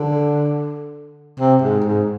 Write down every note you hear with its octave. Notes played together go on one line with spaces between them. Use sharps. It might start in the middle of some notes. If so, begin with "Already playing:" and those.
Already playing: D3
C3
G#2
G#2